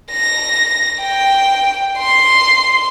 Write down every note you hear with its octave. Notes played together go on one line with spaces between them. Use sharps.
A#6
G5
C6